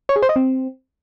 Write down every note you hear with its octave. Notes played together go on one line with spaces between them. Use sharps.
C#5
G#4
C5
D#5
C4